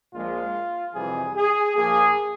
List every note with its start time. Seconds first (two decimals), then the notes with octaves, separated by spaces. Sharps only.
0.14 A#1 A#2 F3 G#3 F4
0.95 F2 C3 E3 G3 G#4
1.36 G#4
1.76 A#1 A#2 F3 A#3 G#4